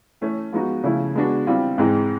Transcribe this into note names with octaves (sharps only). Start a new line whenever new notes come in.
E3 A3 C#4
F3 G#3 B3 D#4 F#4
C#3 F3 A3 C#4 E4
G#3 B3 D4 F#4
E3 G3 C4 F4
G#2 E3 G#3 C4 D#4